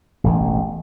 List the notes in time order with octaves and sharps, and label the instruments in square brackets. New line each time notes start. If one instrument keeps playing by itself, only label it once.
[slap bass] E1 A1